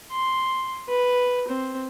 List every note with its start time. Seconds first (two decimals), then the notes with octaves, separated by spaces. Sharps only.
0.11 C6
0.89 B4
1.48 C4